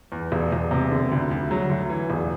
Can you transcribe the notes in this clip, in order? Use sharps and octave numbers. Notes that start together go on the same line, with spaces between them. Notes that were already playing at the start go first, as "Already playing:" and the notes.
E2
E1
E1
C3
D3
D2
D2
F#3
D2
E3
E1